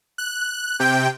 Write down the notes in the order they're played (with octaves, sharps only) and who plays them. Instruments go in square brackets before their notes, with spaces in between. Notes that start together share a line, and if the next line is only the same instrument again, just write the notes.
[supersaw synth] F#6
[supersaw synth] C3 G5 [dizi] G6